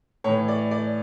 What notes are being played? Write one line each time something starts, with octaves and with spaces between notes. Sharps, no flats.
A2 E3 C#5
D5
D5